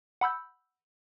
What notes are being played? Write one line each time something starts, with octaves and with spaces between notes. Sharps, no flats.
F#5 B5 E6 G6